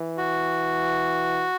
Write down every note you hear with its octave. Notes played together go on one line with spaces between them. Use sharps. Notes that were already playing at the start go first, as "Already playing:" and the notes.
Already playing: E3
F#4